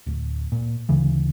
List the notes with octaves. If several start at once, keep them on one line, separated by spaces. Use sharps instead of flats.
D1
A#2
D2 C#3 E3